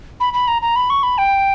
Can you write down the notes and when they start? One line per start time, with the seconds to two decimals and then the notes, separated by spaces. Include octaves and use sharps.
0.20 B5
0.33 B5
0.48 A#5
0.62 A#5
0.76 B5
0.90 C#6
1.03 B5
1.18 G5